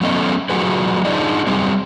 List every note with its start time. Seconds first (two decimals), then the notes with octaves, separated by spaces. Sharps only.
0.01 F#3 A3 B3 C#4 A4 D#5
0.50 F#3 A3 F4 F#4 G#4 B4
1.05 D4 D#4 F4 G#4 D5 D#5
1.47 F#3 G3 C4 G#4